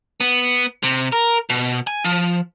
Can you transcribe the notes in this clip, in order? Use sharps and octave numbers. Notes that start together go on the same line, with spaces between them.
B3
C3
A#4
B2
G#5
F3